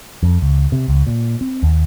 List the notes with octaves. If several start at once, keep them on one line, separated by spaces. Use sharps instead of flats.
F2
C#2
C3
C#2
A#2
C4
D#2